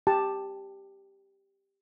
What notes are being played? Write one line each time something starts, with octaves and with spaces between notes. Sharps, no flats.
G4 A5